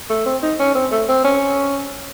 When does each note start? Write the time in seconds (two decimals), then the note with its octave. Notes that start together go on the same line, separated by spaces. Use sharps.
0.10 A3
0.26 C4
0.43 D#4
0.59 C#4
0.75 C4
0.92 A3
1.09 C4
1.24 C#4